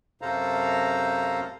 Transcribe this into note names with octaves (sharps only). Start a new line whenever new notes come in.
F#2 C3 A4 C5 F5 A#5